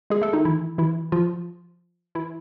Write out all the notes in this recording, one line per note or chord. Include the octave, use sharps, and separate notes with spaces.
G#3 G#4
A3 A4
D#3 D#4
E3 E4
E3 E4
F3 F4
E3 E4